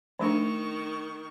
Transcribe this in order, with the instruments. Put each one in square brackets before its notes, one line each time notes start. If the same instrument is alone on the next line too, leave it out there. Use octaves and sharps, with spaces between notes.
[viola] D#3 C#6 [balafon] F3 A3 D4